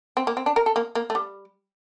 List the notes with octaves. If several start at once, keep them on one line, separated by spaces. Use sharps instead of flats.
C4
A#3
C4
D4
A#4
A4
A#3
A#3
A3
G3